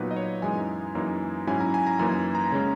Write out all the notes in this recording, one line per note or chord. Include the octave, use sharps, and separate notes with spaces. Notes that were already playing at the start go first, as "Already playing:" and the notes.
Already playing: A#2 F#3 B3 D#4 B4
D#5
C#5
F#2 E3 G#3 D#4 G#5
F#2 E3 A#3 D#4
G#2 F#3 C#4 E4 G#5
A#5
G#5
A#5
F#2 E3 A#3 D#4 G#5
A#5
C#3 G#3 C#4